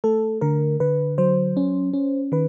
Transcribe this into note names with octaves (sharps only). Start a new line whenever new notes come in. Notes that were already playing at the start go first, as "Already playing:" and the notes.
A3 A4
D3 A#4
D3 B4
F#3 C5
C#4
C#4
D#3 B4